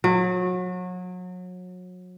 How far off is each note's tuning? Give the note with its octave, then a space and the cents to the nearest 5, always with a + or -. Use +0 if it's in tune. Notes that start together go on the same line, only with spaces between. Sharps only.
F#3 -30